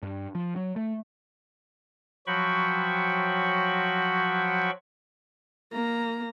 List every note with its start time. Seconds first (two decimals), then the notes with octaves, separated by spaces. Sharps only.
0.02 G2
0.35 F3
0.56 F#3
0.76 A3
2.27 F3 F#3 F#4 G5 B5 C#6
5.72 A#3 A#5